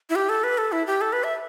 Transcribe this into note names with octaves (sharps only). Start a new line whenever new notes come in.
E4
G4
A4
B4
A4
E4
G4
A4
B4
E5